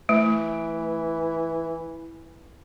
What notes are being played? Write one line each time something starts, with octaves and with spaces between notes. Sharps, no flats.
E3 A3